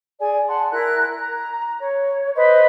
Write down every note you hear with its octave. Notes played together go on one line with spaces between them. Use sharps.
G#4 D5 G#5
F#5 A5 C6
E4 A#4 F#6
A#5
C#5
B4 C5 D#5